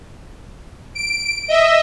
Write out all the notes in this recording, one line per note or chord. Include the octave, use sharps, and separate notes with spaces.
D7
D#5 E5